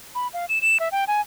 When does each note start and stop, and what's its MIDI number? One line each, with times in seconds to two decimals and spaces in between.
0.15 0.28 83
0.33 0.46 77
0.49 0.61 100
0.62 0.78 100
0.80 0.89 76
0.92 1.04 79
1.08 1.21 80